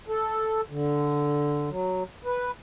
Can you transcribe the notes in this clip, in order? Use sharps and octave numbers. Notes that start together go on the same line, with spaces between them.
A4
D3
F#3
B4